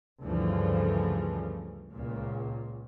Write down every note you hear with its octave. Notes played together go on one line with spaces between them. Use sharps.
D2 G2 C#3 E3 F3 A3
C#2 A#2